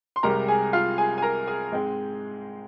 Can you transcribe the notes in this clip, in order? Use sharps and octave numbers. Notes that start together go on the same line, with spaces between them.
C6
C2 C3 G#3 A#4 A#5
G#4 G#5
F4 F5
G#4 G#5
G#5
A#4 A#5
G#4 G#5
G#2 G#3 C4